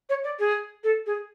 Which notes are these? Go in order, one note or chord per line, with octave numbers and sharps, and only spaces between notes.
C#5
D5
G#4
A4
G#4